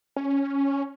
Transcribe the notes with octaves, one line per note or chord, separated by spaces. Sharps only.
C#4